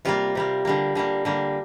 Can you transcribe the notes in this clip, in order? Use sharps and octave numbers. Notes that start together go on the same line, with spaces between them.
C3 G3 A#3 F4
C3 G3 A#3
D3 G3 A#3
D3 G3 A#3
D3 G3 A#3